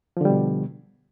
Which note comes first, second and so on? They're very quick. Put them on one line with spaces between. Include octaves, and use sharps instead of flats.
F3 D3 G3 B2